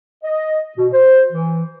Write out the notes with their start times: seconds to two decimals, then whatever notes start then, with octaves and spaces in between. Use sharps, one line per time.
0.24 D#5
0.77 B2
0.93 C5
1.32 E3